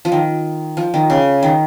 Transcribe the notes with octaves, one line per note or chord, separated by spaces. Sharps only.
F3
D#3
F3
D#3
C#3
D#3